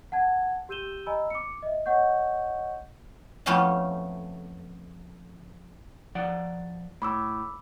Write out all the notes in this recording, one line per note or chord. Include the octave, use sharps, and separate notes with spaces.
F#5 A5 G#6
G4 E6 G6 D#7 E7 G7
D#5 G#5 A#5 B5 E6
D6 C#7
D#5 E5
C#5 D#5 F#5 C#6 G6
F2 A3 B3 C#4 F5 A5
F3 D5 F#5
A2 B5 D6 E6